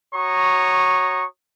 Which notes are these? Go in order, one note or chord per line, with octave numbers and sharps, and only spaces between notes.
F#4 C#5 A#5 C#6 D#6